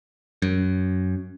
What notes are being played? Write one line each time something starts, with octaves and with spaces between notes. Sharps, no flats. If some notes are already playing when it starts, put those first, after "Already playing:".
F#2